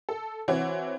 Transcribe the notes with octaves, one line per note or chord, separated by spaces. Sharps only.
A4
E3 C4 F#4 C#5